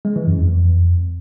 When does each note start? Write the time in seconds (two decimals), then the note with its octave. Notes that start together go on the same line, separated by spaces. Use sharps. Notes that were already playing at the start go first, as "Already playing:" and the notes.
0.05 G#3
0.16 E3
0.27 F#2
0.38 F2